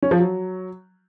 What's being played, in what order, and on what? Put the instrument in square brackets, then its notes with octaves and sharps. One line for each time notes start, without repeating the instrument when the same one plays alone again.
[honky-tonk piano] C#4
F3
F#3